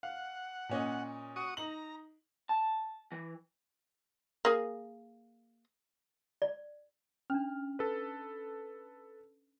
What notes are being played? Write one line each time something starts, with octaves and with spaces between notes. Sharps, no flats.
F5 F#5
A#2 C#4 D#5
F#4 C#6 D#6
D#4 A#5 F#7
A5
E3
A#3 G#4
D5
C#4 D4 F6
A4 B4